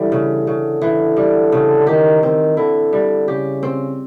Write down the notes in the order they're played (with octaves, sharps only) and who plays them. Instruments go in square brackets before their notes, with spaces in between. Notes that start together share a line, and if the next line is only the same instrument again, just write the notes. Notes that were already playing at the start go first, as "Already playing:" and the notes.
Already playing: [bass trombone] D3 [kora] E3 G3
[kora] C#3
C#3
E3
G3
C#3
[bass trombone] D#3 [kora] G4
[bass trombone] D#3 [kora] C4
[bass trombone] D3 [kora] E4
[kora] G3
[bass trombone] C#3 [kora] G4
[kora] C4